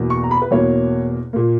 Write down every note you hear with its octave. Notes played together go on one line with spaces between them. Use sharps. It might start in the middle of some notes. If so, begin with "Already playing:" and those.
Already playing: E2 B2 A#3
C#6
A#5
B5
B4
E2 B2 A#3 C#5
A#2 A#3